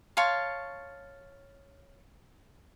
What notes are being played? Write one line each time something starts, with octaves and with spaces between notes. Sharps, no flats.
C#5 F5 A5 C6